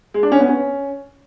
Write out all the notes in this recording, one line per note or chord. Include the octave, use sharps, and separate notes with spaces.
G#3
D4
C#4
B3
C#4